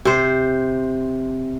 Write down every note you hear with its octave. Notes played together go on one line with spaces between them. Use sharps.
C3 C5